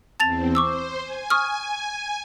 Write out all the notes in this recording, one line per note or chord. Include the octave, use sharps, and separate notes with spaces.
E2 C4 A5 A6 F7
C5 C#6 D6 E6
G#5
C#6 D#6 F6